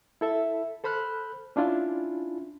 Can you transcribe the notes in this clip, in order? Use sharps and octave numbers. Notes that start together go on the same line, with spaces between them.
E4 A4 E5
A4 C5 B5 F6 F#6
C#4 D4 E4 F4